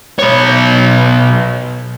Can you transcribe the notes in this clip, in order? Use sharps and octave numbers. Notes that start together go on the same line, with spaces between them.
B1 C#5